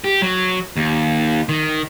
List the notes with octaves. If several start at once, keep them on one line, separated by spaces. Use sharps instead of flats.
G4
F#3
D#2
D#3